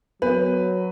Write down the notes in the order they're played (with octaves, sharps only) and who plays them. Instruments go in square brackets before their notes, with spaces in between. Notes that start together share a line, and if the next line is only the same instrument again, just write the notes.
[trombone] F#3 [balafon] B3 A#4 [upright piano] B4